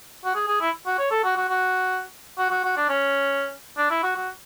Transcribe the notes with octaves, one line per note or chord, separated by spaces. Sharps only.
F#4
G#4
G#4
E4
F#4
C#5
A4
F#4
F#4
F#4
F#4
F#4
F#4
D4
C#4
D4
E4
F#4
F#4